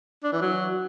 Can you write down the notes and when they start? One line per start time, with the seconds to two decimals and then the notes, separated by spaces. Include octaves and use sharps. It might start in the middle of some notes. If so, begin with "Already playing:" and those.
0.24 D4
0.33 E3
0.42 F#3